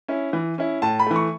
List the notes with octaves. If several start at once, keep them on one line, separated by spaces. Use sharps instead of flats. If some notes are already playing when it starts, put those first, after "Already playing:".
C#4 E4
E3
C#4 E4
A2 A5
B5
E3 A3
C#6